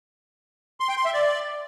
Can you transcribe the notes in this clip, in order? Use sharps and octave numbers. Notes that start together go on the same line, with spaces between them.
C6
G5
C6
E5
D5